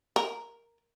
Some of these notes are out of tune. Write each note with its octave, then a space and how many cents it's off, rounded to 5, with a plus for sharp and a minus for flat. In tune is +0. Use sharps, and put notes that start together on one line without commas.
A#4 +0